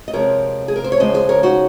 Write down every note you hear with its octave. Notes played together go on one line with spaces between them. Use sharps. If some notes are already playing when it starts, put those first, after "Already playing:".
D#5
C3 F3 G#3 C4 A#4 C#5
G#4
A#4
C5
C#5
D#2 C#3 F3 G#3 C5 D#5
G#4 C5
A#4 C#5
D#4 F#4